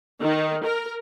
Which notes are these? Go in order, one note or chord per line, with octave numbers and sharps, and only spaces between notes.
D#3
A#4